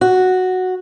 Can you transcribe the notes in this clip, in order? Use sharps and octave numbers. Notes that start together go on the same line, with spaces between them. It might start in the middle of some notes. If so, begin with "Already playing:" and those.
F#4